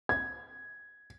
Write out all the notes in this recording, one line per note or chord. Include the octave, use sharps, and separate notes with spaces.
G#6